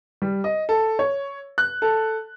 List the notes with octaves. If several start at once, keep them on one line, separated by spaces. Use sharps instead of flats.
G3
D#5
A4
C#5
F#6
A4